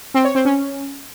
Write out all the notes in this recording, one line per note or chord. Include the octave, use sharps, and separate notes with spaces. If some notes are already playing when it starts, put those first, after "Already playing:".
C4
C#5
C4
C#4